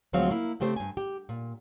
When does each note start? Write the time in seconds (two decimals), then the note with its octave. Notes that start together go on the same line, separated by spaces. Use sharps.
0.13 D2 F3 F#3 G#3 C4 F5
0.30 A#3 E4
0.60 C#3 A3 C4 G4 C5
0.76 G2 G#5
0.97 G4
1.29 A#2